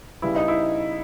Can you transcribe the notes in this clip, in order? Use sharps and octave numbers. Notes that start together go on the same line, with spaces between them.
C#3 G3 B3 E4
D#4
E4